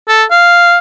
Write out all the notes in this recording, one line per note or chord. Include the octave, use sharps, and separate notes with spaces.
A4
F5